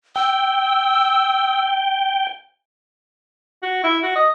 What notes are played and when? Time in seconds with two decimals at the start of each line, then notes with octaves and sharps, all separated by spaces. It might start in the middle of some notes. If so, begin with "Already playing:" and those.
0.16 G5 E6
3.63 F#4
3.84 E4
4.03 F#4
4.16 D#5